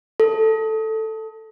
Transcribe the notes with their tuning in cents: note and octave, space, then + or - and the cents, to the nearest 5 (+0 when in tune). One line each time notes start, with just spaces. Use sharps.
A4 +5